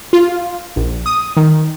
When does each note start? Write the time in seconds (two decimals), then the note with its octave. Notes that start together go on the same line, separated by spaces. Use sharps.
0.13 F4
0.76 A#1
1.06 D#6
1.37 D#3